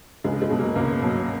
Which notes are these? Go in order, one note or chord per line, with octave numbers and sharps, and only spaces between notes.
C#2 G#3
G#3
B2 F#3
A#3
C#2 A#3
B2 F#3